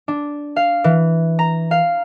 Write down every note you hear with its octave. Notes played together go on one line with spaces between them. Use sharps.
D4
F5
E3
A#5
F5